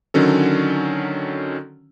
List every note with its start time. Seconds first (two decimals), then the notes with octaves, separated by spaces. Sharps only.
0.14 D3 D#3 F#3 C#4 A4